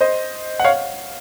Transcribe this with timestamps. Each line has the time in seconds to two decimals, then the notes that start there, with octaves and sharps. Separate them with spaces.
0.01 C5 D#5
0.60 F#5
0.64 C#5 F5